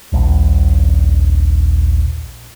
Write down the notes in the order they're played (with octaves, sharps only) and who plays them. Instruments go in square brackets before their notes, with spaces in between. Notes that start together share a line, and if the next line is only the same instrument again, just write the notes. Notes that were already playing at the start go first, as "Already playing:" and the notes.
[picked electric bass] D#1 A#1